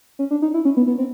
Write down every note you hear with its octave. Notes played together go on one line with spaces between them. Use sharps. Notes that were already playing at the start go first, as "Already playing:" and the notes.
C#4
D4
D#4
E4
C#4
B3
B3
C4